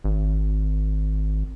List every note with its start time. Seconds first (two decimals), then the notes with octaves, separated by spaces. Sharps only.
0.04 G#1